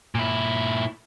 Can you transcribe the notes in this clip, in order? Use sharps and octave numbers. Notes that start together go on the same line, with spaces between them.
A#2 E4